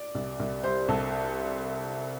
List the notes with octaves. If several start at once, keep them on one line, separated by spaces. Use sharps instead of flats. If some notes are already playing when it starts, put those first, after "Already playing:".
Already playing: D5
C2
C2
G3 C5
C2 A4